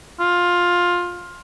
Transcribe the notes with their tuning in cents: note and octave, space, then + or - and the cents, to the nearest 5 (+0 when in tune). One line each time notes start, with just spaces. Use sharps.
F4 +15